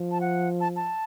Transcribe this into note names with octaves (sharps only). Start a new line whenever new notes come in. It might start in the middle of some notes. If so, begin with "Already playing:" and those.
Already playing: F3
A5
F#5
A5
A5